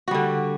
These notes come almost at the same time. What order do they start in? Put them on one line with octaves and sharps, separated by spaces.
F#4 G3 D3